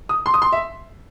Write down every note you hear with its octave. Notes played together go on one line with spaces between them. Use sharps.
D#6
C6
D#6
C6
E5